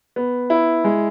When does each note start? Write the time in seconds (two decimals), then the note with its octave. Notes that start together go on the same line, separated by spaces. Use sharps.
0.16 B3
0.50 E4
0.84 G#3